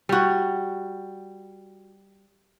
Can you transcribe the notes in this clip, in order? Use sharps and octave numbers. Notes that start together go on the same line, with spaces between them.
G3 F#4